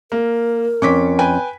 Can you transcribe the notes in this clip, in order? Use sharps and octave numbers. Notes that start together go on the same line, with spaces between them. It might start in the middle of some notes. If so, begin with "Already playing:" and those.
A#3 A#4
F2 C#4 C#6 D6 B6
B4 G5 G#5